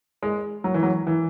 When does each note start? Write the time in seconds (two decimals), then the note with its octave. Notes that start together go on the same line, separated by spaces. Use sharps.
0.23 G#3
0.64 F#3
0.74 E3
0.83 F#3
1.07 E3